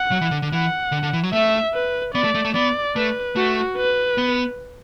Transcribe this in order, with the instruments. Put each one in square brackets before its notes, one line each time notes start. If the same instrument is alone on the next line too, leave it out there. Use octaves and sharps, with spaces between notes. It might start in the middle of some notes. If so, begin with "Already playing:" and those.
Already playing: [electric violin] F#5
[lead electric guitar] F#3
E3
D3
D3
[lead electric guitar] E3 [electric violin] F#5
[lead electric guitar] D3
D3
E3
F#3
[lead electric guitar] A3 [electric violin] E5
[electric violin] B4
[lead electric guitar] B3 [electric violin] D5
[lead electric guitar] A3
A3
A3
[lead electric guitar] B3 [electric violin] D5
[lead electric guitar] A3 [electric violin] B4
[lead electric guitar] A3 [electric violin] F#4
[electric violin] B4
[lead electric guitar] B3